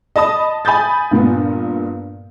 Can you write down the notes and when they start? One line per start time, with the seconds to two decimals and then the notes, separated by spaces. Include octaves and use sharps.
0.16 D#5 A5 B5 D#6
0.65 G#5 B5 D#6 G6 A6
1.11 G2 A#2 B3